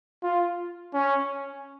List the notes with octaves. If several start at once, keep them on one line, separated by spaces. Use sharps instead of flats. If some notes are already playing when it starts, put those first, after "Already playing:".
F4
C#4